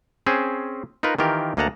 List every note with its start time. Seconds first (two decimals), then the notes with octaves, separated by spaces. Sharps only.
0.27 C4 C#4 G#4 C5
1.03 D#4 F4 A#4 B4
1.19 D#3 E3 F4 G4 A#4
1.57 D2 A#3 D#5 F#5 A5 A#5